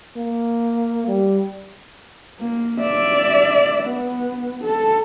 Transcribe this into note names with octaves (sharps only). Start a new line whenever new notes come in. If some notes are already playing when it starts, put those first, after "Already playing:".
A#3
G3
A#3
D5 E5
B3
A4